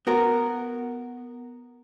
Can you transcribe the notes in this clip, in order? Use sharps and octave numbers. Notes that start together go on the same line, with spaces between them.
B3 F#4 A#4